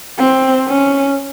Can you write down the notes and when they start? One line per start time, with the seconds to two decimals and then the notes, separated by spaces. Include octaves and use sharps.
0.18 C4
0.68 C#4